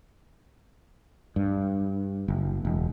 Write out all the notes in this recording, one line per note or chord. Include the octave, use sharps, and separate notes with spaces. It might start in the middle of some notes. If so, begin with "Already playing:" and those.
G2
F#1
E1